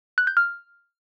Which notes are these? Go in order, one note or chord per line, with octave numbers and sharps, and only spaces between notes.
F#6
G6
F6